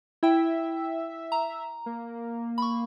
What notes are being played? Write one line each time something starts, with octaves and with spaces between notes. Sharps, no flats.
E4 E5 G5
A#5
A#3
B5 C#6